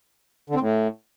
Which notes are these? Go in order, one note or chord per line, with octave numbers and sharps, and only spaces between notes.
D3
C4
A2